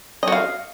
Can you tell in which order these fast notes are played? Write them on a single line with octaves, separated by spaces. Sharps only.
D#5 F#4 F5